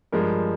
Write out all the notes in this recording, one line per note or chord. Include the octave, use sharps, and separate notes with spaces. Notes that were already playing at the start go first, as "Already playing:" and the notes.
G2 F3 G#3 A#4